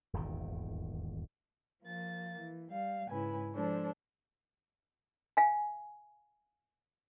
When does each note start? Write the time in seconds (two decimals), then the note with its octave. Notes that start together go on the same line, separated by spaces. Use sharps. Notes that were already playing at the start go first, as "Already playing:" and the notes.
0.13 D#1 G#1 E2 D#3
1.83 F3 A#3 A6
2.38 E3
2.71 G3 F5
3.10 G#2 C#3 E4 B4 G#5
3.53 F3 G#3 D4 A4 C5
5.37 F5 G#5